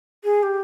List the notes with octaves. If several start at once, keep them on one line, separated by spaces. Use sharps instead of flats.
G#4
G4